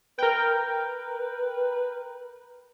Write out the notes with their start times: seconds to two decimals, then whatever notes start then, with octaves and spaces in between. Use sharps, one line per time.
0.19 A#4 B4 G5